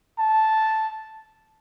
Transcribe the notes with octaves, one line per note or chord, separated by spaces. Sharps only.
A5